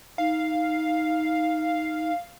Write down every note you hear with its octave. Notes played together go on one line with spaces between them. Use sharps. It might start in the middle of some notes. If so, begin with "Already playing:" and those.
D#4 F5